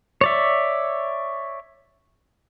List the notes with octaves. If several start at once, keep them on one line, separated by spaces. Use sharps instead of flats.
C#5 D5 E5